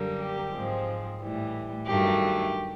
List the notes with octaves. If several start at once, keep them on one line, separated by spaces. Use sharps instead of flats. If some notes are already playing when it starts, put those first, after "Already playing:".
Already playing: F#2 D3 G3 A#3
G4
G#2 F3 G#3 C4
A2 E3 G3
G2 D#3 F#3 A3 G4